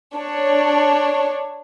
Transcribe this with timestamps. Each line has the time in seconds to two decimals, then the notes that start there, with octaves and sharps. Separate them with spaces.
0.15 D4 C#5